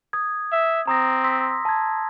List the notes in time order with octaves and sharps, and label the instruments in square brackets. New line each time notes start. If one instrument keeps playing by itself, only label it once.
[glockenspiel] D#6 G#6
[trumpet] E5
[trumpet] C4 [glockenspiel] A#5 D#6 A#6
[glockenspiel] C6 E6 B6
A5 G#6